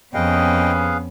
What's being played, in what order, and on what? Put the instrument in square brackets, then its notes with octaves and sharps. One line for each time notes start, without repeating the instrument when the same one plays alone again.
[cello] F2 [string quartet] B3 C#4 [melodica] G#4 B4 F5 [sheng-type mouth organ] D#5 G5